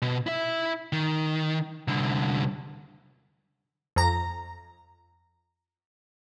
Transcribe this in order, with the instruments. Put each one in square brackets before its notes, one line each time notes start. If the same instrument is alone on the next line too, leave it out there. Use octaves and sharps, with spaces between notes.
[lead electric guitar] B2
E4 E5
D#3
C2 D3
[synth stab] F2 A#5